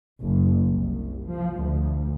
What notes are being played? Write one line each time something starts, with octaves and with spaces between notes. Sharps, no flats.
F#1
C2
F3
D2